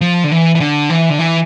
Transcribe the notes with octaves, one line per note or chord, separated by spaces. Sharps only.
F3
D3
E3
E3
D3
E3
D3
E3